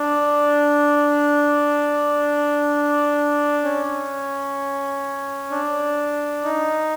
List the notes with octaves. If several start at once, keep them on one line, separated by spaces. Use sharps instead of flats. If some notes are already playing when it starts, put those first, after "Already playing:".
Already playing: D4
C#4
D4
D#4